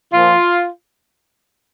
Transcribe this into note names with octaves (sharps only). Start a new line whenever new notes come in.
A#2 F3 F4